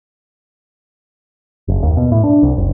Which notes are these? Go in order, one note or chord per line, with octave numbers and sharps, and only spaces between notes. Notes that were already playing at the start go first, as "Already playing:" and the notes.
F#1
D#2
B2
A2
D4
C2
F#1